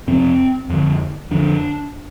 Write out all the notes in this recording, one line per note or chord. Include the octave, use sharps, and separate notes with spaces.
F2 C3 C4
F2 D3
F2 D3 D4